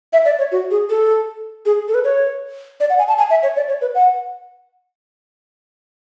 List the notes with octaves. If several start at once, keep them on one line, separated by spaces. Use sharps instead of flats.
E5
D5
C#5
F#4
G#4
A4
G#4
A4
B4
C#5
D5
F#5
G#5
A5
G#5
E5
C#5
D5
C#5
B4
F#5